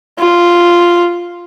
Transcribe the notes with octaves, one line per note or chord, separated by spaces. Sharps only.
F4